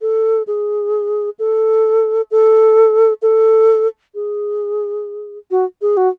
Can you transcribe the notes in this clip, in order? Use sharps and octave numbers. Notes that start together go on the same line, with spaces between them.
A4
G#4
A4
A4
A4
G#4
F#4
G#4
F#4